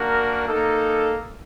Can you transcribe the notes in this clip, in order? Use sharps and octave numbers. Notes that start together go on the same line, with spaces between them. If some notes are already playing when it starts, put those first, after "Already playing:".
Already playing: A#3 D4 F#4 A#4
A#3 D#4 A4